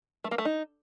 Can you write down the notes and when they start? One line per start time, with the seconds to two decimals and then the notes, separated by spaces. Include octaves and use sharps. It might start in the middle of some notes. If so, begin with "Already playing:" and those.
0.24 A3
0.31 A#3
0.38 A3
0.45 D#4